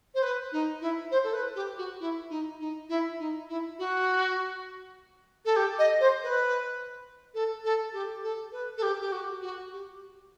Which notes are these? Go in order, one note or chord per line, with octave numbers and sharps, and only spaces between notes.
C5
B4
D#4
E4
C5
A4
B4
G4
F#4
E4
D#4
D#4
E4
D#4
E4
F#4
A4
G4
D#5
C5
B4
A4
A4
G4
A4
B4
A4
G4
G4
F#4
F#4
G4